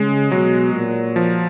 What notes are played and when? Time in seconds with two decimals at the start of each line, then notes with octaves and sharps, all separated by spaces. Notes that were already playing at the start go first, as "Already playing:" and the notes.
Already playing: C#3 G#3
0.31 B2 F#3
0.74 A#2
1.16 F3